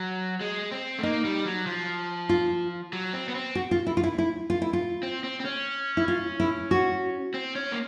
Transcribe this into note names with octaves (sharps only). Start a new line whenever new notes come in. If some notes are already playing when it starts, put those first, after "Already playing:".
Already playing: F#3
G#3
C4
A3
A#3 D#4
G3
F#3
F3
F4
F#3
C4
B3
C4
F#4
F4
E4
F4
E4
E4
F4
E4
F4
C4
C4
C4
C#4
E4
F4
E4
F#4
C4
C#4
A#3